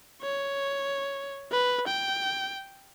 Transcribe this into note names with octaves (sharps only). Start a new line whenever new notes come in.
C#5
B4
G5